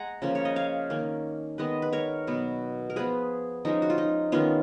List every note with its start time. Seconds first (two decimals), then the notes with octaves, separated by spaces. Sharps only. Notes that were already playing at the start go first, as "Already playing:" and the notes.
Already playing: G#3 F#5 G#5 A#5
0.22 C#3 F3 A#3 C#4
0.35 C#5
0.45 D#5
0.56 C#5 F5
0.90 D#3 A#3 C#4
1.58 D#3 G#3 B3 B4 D#5
1.82 B4
1.93 A#4 C#5
2.27 B2 F#3 B3
2.90 A#4
2.96 F3 B3 G#4 B4
3.65 F3 G#3 C#4 D#4
3.82 F#4
3.90 F4
3.98 D#4
4.32 D#3 G#3 B3 C#4 F4